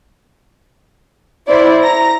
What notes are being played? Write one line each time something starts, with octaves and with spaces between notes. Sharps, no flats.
E4 C5 D5
A#5 A#6